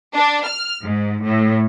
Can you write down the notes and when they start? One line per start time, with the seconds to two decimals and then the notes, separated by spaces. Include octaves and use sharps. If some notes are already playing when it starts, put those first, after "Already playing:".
0.15 D4
0.47 F6
0.83 G#2
1.25 A2